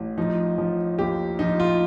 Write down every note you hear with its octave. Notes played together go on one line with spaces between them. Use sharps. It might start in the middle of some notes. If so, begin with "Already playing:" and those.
Already playing: A1
F3 D#4
F3
D#2 G4
F3 D#4
F4